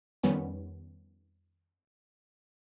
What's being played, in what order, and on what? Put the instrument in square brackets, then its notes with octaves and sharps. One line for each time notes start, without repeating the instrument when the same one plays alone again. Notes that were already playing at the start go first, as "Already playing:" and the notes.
[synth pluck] F2 D#3 G3 B3 C#4